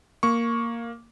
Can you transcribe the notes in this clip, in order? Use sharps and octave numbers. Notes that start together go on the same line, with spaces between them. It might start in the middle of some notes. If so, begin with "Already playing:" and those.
A#3 C#6